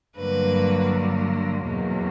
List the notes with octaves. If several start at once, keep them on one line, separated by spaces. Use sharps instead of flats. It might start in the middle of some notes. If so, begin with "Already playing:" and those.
G2 D3 F#3 A#3 B4
E2 B2 F#3 A#3